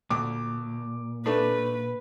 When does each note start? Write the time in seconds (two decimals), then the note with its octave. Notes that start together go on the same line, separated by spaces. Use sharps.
0.10 D2 A#2 D6
1.26 A3 D4 B4